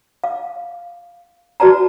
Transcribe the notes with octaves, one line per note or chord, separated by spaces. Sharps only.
F5
F#4 B4 D5 A5 A#5